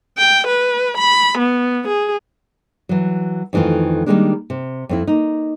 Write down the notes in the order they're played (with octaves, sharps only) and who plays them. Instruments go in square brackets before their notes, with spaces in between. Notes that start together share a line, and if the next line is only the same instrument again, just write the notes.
[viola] G5
B4
B5
B3
G#4
[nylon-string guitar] E3 F#3
F2 D#3 E3 A3 F4
D#3 E3 G3 G#3 A#3 D4
C3
F2 C4 E4
A#3 D#4